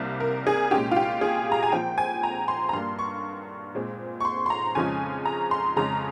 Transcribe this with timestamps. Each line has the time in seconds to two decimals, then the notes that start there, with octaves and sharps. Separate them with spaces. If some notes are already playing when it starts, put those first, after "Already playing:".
Already playing: C2 C3 G3 A#3
0.20 A#4
0.47 G#4
0.71 A#2 G#3 C#4 G4
0.91 F4
0.96 G4
1.21 G#4
1.52 A#5
1.63 G#5
1.72 A#2 F3 C4 G5
1.98 G#5
2.23 A#5
2.48 C6
2.69 A#5
2.73 G2 G3 A#3 C6
2.99 C#6
3.75 A#2 G#3 C4
4.20 C#6
4.25 C6
4.46 C6
4.50 A#5
4.75 F2 C#3 F3 G#3 C#4 G#5
5.25 A#5
5.51 C6
5.76 F2 C#3 G#3 C#4 A#5